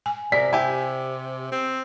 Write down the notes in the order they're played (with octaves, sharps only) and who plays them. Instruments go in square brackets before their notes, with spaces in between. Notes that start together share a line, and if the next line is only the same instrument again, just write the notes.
[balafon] G#5
[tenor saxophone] C3 [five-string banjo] A#4 [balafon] D5 [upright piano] B6
[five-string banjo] E4 G4 [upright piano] G#5
[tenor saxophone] C4